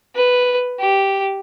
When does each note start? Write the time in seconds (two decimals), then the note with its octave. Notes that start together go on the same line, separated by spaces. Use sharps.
0.16 B4
0.79 G4